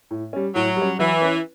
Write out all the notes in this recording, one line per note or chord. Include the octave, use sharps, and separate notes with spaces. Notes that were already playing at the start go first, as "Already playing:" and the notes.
A2
G3 C#4
A2 F#3
G3
C#4
E3 F#3
C#4 E4 B4